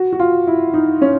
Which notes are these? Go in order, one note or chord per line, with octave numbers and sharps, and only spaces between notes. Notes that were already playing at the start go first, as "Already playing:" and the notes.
Already playing: F#4
F#4
F4
E4
D#4
C#4